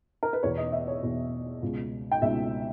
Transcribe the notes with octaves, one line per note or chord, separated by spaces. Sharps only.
A#4
B4
E2 B2 C#5
D#5
E5
C#5
E2 B2
C#2 B2
G5
C#2 B2 E5